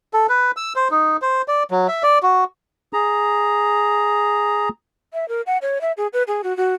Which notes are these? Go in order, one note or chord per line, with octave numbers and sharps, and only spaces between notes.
A4
B4
E6
C5
D#4
C5
D5
F#3
E5
D5
F#4
G#4 A#5
E5
A#4
F#5
C#5
E5
G#4
B4
G#4
F#4
F#4